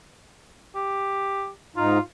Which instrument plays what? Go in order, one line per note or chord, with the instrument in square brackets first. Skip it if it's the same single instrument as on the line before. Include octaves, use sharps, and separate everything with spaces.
[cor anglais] G4
[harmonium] G#2 D#4 [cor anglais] F4